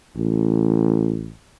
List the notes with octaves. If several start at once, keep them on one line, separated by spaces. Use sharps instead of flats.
A1